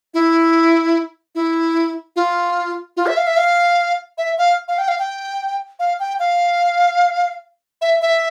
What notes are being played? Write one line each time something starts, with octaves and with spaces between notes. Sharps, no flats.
E4
E4
F4
F4
E5
F5
E5
F5
E5
F5
F5
G5
F5
G5
F5
G5
F5
E5
E5